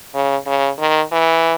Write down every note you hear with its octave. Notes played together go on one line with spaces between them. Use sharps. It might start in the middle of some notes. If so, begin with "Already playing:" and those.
C#3
C#3
D#3
E3